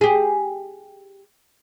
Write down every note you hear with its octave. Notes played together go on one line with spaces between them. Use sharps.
G4 G#4